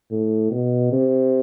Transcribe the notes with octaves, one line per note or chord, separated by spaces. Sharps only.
A2
B2
C3